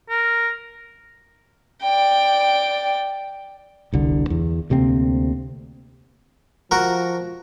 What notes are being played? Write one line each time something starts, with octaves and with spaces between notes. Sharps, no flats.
A#4
D5 G5
E1 C2 D3
E2
D2 C3 A#3 C4
F3 F#4 A#4